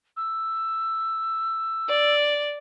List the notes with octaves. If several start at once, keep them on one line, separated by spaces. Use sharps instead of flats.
E6
D5